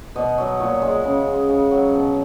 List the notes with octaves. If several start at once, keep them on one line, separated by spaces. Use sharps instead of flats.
B2 D#5
F#3 D#5
A#2 C#5
G#3
C#3
G#3
C#3
F#3
B2